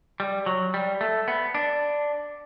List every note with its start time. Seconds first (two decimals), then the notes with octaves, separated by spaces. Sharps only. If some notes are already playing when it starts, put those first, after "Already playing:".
0.20 G3
0.46 F#3
0.74 G3
1.01 A3
1.28 B3
1.55 D4